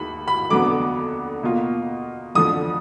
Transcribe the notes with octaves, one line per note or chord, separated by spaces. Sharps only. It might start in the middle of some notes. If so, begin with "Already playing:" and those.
Already playing: D#2 G#3 B5
B5
F2 D3 F#3 B3 D6
B2 A#3 F4
F2 D3 F3 D#6